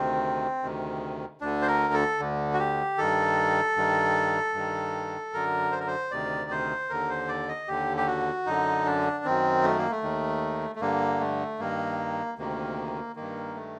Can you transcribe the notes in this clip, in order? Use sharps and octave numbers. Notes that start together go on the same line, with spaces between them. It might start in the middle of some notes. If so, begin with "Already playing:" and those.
Already playing: D2 C3 D#3 C4
D2 C3 D#3
D2 D3 D4
C5
A#4
A4
D2 D3
F#4
G4
G2 D#3 A4
G2 D#3
G2 D#3
F#2 D3 A#4
C5
A#4
C5
D2 C3 D#3 D5
C5
D#2 D3 A#4
C5
D5
D#5
D#2 D3 G4
G4
F#4
F#2 D3 D#4
D4
F#2 D#3 C4
A3
A#3
A3
D#2 D#3
A3
G2 D3 A#3
A3
G2 D#3 A#3
D2 C3 D#3 A#3
G2 D#3 A#3
A3